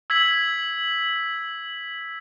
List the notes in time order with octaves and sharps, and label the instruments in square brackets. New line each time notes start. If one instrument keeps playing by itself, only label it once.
[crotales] E6 G#6 B6 F#7